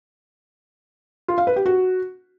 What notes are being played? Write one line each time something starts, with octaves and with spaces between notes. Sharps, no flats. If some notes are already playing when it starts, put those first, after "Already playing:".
F4
F5
B4
G4
F#4